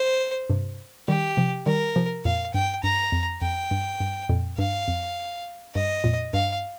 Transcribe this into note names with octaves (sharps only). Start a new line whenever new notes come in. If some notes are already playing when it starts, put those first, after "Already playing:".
Already playing: C5
G2 C3
D#3 G3 G4
C3 F3
D#3 G3 A#4
C3 F3
F2 A#2 F5
G2 G5
G2 A#5
F2
F2 G5
G2
G2
F2 A#2
G2 F5
F2
G2 D#5
F2 A#2
G2 F5